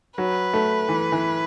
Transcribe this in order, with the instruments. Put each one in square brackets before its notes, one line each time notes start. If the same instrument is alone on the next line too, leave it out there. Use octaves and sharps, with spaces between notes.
[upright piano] F#3 [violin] B4
[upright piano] A3
E3
E3